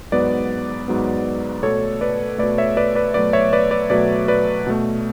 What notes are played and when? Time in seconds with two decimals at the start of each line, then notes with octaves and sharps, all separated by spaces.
0.12 G#2 F#3 B3 B4 D5
0.88 G#2 F#3 B3
1.63 B2 A3 A4 C#5
2.01 B4 D5
2.38 B2 A3 B4 D5
2.58 C#5 E5
2.77 B4 D5
2.95 B4 D5
3.14 B2 F#3 A3 B4 D5
3.33 C#5 E5
3.53 B4 D5
3.71 B4 D5
3.90 B2 F#3 A3 B4 D5
4.28 B4 D5
4.67 B2 A3